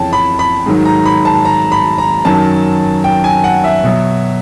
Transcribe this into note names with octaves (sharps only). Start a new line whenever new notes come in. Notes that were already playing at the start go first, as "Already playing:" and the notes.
Already playing: F2 C#3 E3 C#5 G5 A5
B5
B5
G#2 D#3 F#3
A#5
B5
A5
A#5
B5
A#5
F#2 D#3 F#3 A5
G5
G#5
F#5
E5
B2 F#3